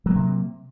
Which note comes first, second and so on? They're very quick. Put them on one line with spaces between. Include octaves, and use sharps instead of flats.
F#3 A#3 C3